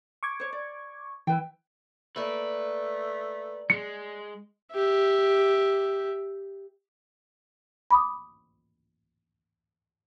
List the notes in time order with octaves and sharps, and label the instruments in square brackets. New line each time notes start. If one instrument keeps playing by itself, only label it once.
[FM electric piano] C#6 D6 G#6
[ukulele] C5 C#5
D5
[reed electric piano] E3 [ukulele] E4 B4 G5
[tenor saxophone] A3 [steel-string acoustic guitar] A#3 D5 [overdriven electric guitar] B4
[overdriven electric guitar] G#3 [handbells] C#7
[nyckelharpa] G4 E5
[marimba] B5 D6 D#6